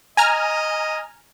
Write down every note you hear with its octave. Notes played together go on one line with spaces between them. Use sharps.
D#5 G#5 A#5 F6